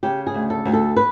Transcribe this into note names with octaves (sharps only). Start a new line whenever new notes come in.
C#3 G4
G#4
D2
A4
D2
A4
B4